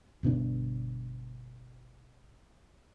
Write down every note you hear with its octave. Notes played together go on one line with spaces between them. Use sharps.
G1 B2 B3 D4